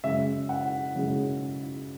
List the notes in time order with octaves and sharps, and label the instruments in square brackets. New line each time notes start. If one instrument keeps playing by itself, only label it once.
[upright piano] F#2 C#3 G#3 E5
F#5
F#2 C#3 G#3